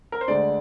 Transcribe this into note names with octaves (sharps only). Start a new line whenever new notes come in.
A#4
C5
D2 D3 G#3 D5